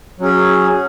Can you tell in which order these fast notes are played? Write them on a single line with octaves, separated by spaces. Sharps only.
F#3 C#4 G#4